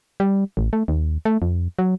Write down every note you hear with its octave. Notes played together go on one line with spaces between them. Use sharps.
G3
A1
A3
D#2
A3
F2
F#3